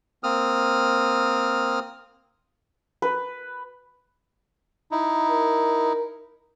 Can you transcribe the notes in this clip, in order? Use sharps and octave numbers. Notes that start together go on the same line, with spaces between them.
A#3 C4 D#6 F6
B4
D#4 E4
A#4